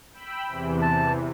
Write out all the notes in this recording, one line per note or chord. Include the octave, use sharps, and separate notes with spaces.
G5 B5 E6
E2 C3 E3
A5